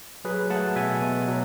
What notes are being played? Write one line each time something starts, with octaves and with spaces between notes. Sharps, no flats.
F#3 G#4 B4
A3 F#5 A5
B2 E5 G#5
B2
F#3